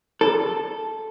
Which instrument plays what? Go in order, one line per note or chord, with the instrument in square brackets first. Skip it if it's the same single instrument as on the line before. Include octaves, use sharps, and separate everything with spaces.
[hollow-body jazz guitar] A4